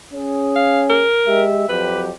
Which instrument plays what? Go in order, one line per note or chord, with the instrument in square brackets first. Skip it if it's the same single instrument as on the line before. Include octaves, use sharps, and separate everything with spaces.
[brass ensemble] C#4 G#4
[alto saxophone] F5
A#4
[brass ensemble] G#3 G4 E5
[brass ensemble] F2 F#3 G4 [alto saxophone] B4